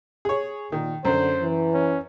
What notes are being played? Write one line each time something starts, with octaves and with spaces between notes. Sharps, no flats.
G#4 C#5
A#2 D#3
F#2 D3 C5
E3
C#4